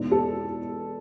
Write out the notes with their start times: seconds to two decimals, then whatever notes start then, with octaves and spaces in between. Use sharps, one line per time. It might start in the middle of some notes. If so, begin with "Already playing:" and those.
Already playing: E2 B2 G#3 D#4
0.12 A4